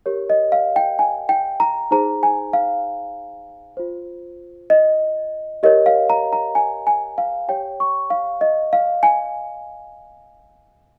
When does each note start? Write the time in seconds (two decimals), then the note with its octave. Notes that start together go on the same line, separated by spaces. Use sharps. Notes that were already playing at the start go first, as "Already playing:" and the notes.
0.06 G4 A#4 C#5
0.30 D#5
0.52 F5
0.76 G5
0.99 G#5
1.29 G5
1.60 A#5
1.91 D#4 G#4 C5 A#5
2.23 G#5
2.53 F5
3.77 F4 C5
4.70 D#5
5.63 G4 A#4 C#5 D#5
5.86 F5
6.10 A#5
6.33 A#5
6.55 G#5
6.87 G#5
7.18 F5
7.48 G4 C#5 G5
7.80 C#6
8.10 F5
8.41 D#5
8.73 F5
9.03 G#5